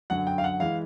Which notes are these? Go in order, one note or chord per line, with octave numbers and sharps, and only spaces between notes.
F#2 D3 F#3 F#5
G5
F5
F#5
E3 G#3 F5